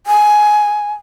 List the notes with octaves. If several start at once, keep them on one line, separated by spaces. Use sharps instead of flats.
G#5